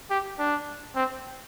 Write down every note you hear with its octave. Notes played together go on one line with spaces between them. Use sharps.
G4
D4
C4